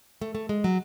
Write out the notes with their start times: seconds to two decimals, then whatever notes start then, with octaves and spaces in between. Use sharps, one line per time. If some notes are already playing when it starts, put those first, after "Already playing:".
0.21 A3
0.35 A3
0.49 G#3
0.64 F#3